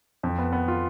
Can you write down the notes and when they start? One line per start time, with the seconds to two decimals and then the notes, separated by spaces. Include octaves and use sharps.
0.23 F2
0.39 B3
0.53 B3
0.68 F4